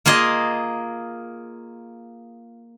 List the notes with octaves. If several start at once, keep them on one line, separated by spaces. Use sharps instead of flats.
A#3 F4 G#4 D#5